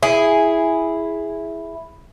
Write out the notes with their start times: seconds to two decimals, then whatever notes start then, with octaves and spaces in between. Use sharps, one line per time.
0.03 E4 G#4